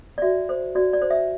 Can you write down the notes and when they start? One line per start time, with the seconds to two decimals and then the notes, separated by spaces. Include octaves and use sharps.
0.18 D5
0.22 F#4 E5
0.49 C5
0.75 F#4 D5
0.93 D5
1.02 C5
1.10 E5